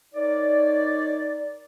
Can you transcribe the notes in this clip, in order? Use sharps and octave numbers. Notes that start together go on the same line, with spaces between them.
D#4 A#4 C#5 D5